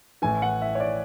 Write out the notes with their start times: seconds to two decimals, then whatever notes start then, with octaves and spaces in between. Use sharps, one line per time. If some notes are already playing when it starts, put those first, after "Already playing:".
0.22 A1 A2 E3 G#5
0.42 F#5
0.62 E5
0.75 C#5
0.80 D5